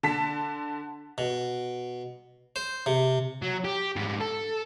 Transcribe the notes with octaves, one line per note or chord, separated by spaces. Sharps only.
D3 A5 B6
B2
C5
C3
F#3
G4
G#2 G3
A4